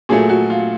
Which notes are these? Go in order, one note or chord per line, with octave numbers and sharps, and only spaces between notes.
A#2 F#3 A3 G#4
F#4
F4